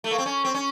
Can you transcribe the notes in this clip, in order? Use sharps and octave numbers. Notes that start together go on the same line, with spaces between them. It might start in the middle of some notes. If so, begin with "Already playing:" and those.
A3
A#3
C4
C#4
C4
C#4